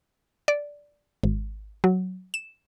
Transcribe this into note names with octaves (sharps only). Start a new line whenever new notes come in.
D5
G#1
F#3
E7